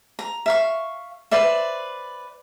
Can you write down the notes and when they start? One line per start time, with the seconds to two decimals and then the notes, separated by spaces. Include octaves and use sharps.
0.19 A#5
0.46 E5 F5 C#6
1.31 B4 C5 D5 E5